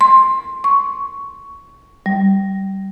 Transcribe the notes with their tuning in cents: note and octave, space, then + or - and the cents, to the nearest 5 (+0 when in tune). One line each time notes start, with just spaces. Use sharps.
C6 +15
C#6 +10
G3 -20